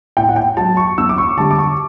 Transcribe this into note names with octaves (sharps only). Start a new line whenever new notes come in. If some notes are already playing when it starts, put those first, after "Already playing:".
A2 G5
F#5
G5
F#3 A5
C#6
F#2 E6
D6
C#6
D3 G3 A5
D6
C#6